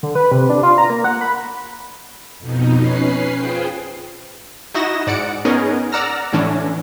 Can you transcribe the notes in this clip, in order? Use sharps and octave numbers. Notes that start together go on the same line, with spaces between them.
D3
B4
C3
D4
F4
A#5
A#3
F#5
B5
F2 B2 D#4
C#4 B4 C7
F4 G#4 C5 G5
D#4 E4 F#4 D#5 A#6 E7
G#2 D5 F#5 C#7 D7
B3 C#4 D#4 G#4 A#4
D5 F#5 A#5 E6 F6 A#6
A2 D3 E3 C#4 D4